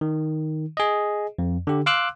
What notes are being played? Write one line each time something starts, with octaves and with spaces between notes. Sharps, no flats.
D#3
G#4 D#5
F2
D3 G4
F5 C6 D6 E6 F#6